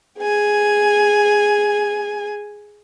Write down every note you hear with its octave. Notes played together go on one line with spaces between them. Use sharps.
G#4 G#5